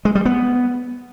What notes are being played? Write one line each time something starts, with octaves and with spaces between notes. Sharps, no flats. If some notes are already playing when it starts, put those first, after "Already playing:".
G#3
G3
B3